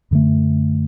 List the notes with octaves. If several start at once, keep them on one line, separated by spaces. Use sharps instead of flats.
F#2 D3 A3